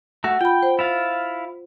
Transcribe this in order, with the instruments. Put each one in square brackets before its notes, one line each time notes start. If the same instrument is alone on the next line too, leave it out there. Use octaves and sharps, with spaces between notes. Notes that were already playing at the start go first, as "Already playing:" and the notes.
[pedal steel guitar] A3 F#4 [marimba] F#5
[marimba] F4 B5 [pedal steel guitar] G5
[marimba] C5
[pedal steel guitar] E4 F4 F5